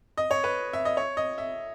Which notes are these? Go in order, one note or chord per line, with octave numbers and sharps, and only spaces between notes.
D#5
C#5
B4
E5
D#5
C#5
D#5
E5